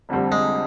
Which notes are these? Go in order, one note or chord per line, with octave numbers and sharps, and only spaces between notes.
F1 F2 D3 G3 C4
G#3